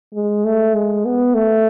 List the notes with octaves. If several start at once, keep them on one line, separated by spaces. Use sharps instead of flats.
G#3
A3
G#3
B3
A3